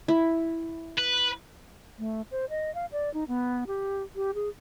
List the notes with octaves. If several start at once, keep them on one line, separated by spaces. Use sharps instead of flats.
E4
B4
A3
C5
D#5
F5
D5
D#4
B3
G4
G4
G#4